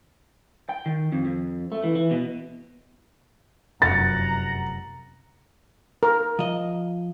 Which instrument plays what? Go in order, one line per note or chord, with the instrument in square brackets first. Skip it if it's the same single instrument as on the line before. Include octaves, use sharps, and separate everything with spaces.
[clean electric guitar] G5
D#3
F2
F2
A3
E3
E3
B2
[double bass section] F1 F#2 [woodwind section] F#5 A#5 [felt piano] A6
[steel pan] A#4
[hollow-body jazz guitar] F3 D#5